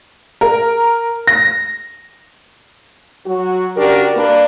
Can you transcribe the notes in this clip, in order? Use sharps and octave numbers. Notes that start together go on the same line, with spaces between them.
A#4
A#6
F#3 F#4
C#3 D4 F#4 G4 A#4
A#3 D4 B4